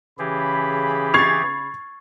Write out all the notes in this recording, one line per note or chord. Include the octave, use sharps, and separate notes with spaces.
C#3 E3 G4 G#4 B5
C#6 G#6 A6 C7 F7